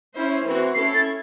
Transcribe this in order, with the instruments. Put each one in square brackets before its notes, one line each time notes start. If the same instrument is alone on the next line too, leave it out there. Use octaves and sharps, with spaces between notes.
[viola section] C#4 E4 C5
E3 C4 F#4
[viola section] C#4 E4 A4 [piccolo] C7
[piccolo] C7
A6
G#6